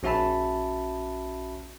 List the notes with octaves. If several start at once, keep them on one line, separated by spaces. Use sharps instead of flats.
A#1 C#4 F#4 E5 A5 B5